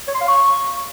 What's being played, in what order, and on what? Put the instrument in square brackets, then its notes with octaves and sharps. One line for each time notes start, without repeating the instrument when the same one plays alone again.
[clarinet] C#5
C6
F5
C#6